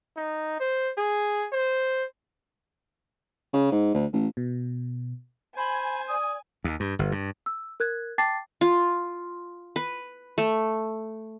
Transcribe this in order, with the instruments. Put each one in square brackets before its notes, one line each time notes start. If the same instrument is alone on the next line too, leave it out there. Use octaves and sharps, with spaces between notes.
[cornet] D#4
C5
G#4
C5
[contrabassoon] C#3
G#2
D2
A1
[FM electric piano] B2
[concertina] C5 [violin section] G#5 [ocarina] B5
[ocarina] D5 [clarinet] D#6
[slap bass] D#2
G2
G1
G2
[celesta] E6
A#4 F#6 G#6
G5 A5 D6 A6 C7
[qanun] F4
B4
A3